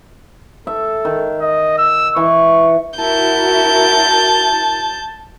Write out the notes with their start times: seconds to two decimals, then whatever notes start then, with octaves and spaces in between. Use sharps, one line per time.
0.67 A4 E5
1.05 D#3
1.41 D#5
1.78 E6
2.16 E3 C#6
2.99 E4 F#4 A#4 A5 G6